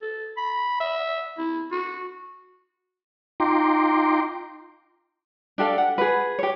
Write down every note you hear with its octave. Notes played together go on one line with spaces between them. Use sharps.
A4
B5
E5
E4
F#4
D#4 F4 G5 A#5 C6 D6
D4 G4 A4 F5
F#5
G#4 B4
G4 C#5